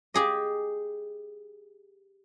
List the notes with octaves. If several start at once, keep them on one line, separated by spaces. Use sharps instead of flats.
G4 G#4 D#5